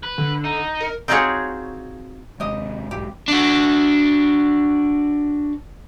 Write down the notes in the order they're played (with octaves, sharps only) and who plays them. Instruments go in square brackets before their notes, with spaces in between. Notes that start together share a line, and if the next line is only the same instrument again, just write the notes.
[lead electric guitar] B4
[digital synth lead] D3
[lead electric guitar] D#4
[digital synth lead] A#4
[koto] C4 D#4 F4 F#4 G#4 C#5
[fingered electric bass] D#2 C3 G#3 [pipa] G4 D#5
[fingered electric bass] B1 G#2 G#3 [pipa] G4
[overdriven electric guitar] D4 F#4